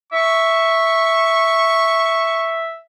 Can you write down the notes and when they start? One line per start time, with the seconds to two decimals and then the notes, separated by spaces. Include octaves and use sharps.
0.13 E5 C#6